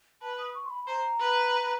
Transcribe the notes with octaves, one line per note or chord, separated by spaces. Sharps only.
B4 A5
D#6
C#6
C6
B5
C5 A#5
B4